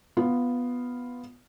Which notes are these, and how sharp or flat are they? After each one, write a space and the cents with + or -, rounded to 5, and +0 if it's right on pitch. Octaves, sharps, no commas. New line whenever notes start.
B3 +0 F4 +0